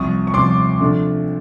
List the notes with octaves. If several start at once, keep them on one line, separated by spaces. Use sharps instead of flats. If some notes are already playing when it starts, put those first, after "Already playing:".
Already playing: C2 C3 F3 C#6 D#6
C#6
C2 C3 F3 C6 D6
C3 F3 A3 D4